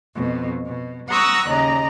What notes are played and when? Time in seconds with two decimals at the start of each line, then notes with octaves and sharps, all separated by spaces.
0.14 F2 B2
0.65 B2
1.07 F#5 A#5 C#6 D#6 E6 F#6
1.47 D#2 C#3 D5 D#5 A#5